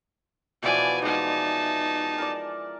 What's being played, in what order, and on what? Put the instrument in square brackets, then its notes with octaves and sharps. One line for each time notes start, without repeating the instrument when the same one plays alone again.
[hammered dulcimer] B2 E3 F3 [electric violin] D5 G#5
[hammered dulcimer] G#3 D5 [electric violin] D#4 A5
[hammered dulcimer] A#4 D5